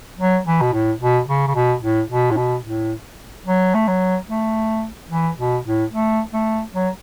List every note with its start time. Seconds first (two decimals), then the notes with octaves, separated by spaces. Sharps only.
0.19 F#3
0.45 E3
0.61 B2
0.73 A2
1.00 B2
1.28 C#3
1.48 C#3
1.54 B2
1.82 A2
2.09 B2
2.31 A2
2.37 B2
2.64 A2
3.46 F#3
3.74 A3
3.88 F#3
4.29 A3
5.10 E3
5.38 B2
5.65 A2
5.92 A3
6.33 A3
6.74 F#3